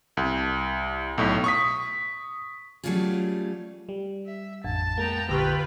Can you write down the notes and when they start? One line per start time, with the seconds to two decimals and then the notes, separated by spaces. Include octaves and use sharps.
0.17 C2
1.18 B1 A2
1.44 C#6 D#6 B6
2.84 F#3 G3 A3 C#4 F4 G#4
3.89 G3
4.26 E5
4.64 A1 F2 A5
4.98 G#3 A#3 B3 G5 A#5
5.29 A#1 D3 F4 G4 B4 G5 C#6